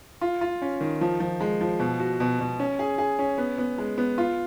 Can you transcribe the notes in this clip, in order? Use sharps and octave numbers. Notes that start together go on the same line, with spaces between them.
F4
F4
C#4
D#3
F3
F3
G#3
F3
B2
F#4
B2
B2
C#4
G#4
G#4
C#4
B3
B3
G#3
B3
F4